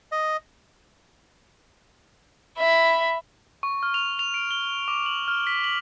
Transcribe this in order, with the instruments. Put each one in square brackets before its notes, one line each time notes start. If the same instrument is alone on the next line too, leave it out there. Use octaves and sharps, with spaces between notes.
[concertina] D#5
[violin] E5 B5
[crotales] C#6
F6
F7
F7
D7
G7
D6
F#7
F6
B6
F#7